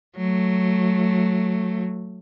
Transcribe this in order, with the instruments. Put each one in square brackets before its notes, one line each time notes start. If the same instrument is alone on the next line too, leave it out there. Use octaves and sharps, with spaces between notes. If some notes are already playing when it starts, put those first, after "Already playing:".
[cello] F#3 A3